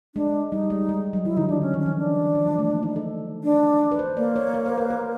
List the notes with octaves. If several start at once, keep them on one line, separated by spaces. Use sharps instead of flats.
G#3 D4
G3 D#4
G#3
G#3
F#3
F3 E4
D3 D#4
D#3 D4
D3 C#4
D#3
C#4
E3
D4
F3
G#3
A3
A#3
D#4
A4
D4
B4
C5
A#3 D5
C#5
C#5
C5
B4
A#4